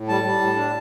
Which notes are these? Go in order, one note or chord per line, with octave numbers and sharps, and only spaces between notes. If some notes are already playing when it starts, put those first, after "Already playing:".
Already playing: A2
G3 A5
G3
A2
D4